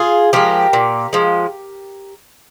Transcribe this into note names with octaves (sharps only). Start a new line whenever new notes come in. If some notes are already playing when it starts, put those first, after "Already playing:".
Already playing: F4 G#4
F3 G#3 G4 A#4
A#2
F3 G#3